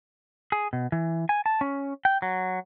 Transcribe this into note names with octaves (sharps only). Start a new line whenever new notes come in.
G#4
B2
E3
G#5
A5
C#4
G5
F#3